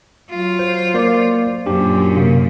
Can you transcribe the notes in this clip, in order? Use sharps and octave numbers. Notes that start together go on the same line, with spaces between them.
F#3 F4
C5
A#3 C5 D5
F#2 A#2 D4 G4
C3 A#3